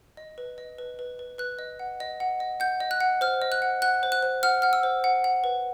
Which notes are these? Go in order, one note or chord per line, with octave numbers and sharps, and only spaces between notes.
D#5
B4
D#5
B4
B4
B4
B4 F#6
D#5
F#5
D#5
F#5
D#5
F#5 G6
D#5
F#6
F#5
C5 F6
D#5
F#6
F#5
F#5 F#6
C5
F#6
C5
F#5 F6
F#5 F6
E6
C5
F#5
F#5
B4